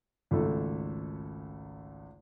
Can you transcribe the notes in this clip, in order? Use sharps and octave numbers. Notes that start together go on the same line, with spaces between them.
G#1 C#2 A3 A4